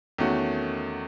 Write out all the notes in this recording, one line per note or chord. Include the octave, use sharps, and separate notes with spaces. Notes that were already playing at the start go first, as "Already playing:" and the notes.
E2 D#3 A3 C#4 F#4